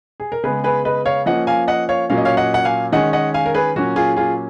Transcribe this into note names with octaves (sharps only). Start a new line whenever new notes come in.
G#4
A#4
C#3 G#3 B3 G#4 B4
G#4 B4
B4 D#5
C#5 F5
F3 A#3 C#4 D#5 F#5
F5 G#5
D#5 F#5
C#5 F5
A#2 F#3 A#3 C#4 F5
D#5
C#5 F5
D#5 F#5
F#5
F5 G#5
D#3 G#3 C#4 D#5 F#5
D#5 F#5
F5 G#5
A#4
G#4 B4
A#2 F#3 A#3 C#4 F#4
F4 G#4
F4 G#4